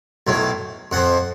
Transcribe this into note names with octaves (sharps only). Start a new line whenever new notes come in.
B1 A2 F#3
F2 F3 F#5